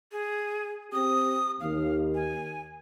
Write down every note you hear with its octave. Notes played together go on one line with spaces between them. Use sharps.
G#4
C4 G4 D#6
D#2 F5
G#5